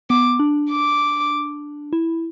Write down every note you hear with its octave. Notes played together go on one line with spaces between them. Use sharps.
B3 D6
D4
D6
E4